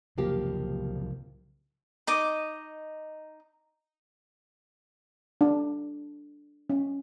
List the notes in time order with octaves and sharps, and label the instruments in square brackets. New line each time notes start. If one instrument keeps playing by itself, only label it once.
[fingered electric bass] C2 C#3 F#3 [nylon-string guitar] F3 A#3 G4
[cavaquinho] D#4 D#5 D6
[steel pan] D4
C#4